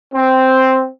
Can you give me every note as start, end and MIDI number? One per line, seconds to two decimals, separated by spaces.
0.13 0.86 60